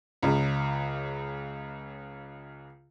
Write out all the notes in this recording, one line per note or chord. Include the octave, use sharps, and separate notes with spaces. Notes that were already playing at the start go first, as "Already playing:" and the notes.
C#2 C#3